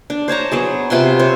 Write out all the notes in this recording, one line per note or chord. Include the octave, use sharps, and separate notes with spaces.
D4
C5 C#5 A5 A#5
F#3 B3 G#4
C3 F4 B4 C6
C5 C#5